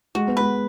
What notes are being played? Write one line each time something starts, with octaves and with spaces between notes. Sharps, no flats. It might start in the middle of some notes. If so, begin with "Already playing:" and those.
G#3 F#4
B3
G#3 B4